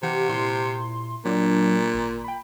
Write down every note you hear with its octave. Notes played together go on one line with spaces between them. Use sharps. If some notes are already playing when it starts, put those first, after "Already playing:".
C3 E3 G4 F#5
A#2 E4 C6
A#2 F#3 D4
G#1
G5 B5